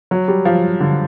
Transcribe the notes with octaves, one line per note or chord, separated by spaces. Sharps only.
F#3
G3
F3
D3